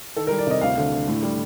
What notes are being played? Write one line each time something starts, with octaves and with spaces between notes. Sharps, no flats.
D#3 A4
A#4
G3
D5
C3 D#5
D2 F5
D3
D3
A2
G3